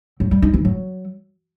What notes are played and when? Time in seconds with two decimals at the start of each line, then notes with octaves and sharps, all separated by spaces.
0.20 F#3
0.31 G3
0.42 D#4
0.54 E3
0.65 F#3